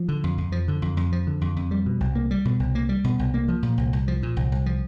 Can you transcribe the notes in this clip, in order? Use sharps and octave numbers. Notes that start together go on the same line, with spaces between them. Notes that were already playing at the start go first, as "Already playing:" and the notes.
Already playing: F3
D3
F2
F2
F3
D3
F2
F2
F3
D3
F2
F2
G3
B2
C2
A#3
G3
B2
C2
A#3
G3
B2
C2
A#3
F3
A#2
C2
C2
F3
A#2
C2
C2
F3